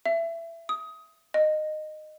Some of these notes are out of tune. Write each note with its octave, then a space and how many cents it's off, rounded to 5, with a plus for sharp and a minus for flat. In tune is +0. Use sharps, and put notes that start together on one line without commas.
E5 +20
D#6 +20
D#5 -15